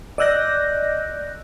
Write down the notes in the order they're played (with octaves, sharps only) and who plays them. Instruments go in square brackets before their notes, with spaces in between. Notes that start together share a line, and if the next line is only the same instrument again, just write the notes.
[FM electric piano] D5 D#5 E6 F#6 G6 A#6